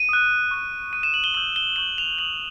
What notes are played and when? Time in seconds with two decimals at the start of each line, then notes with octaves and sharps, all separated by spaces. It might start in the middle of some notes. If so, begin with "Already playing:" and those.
Already playing: D#7
0.09 D#6 F#6
0.51 C#6 F#6
0.92 C#6 F#6 D#7
1.03 E7
1.14 F#7
1.24 G7
1.34 C#6 E6 G6 F#7
1.56 G7
1.76 C#6 E6 G6 F#7
1.98 F7
2.18 D#6 G6 F#7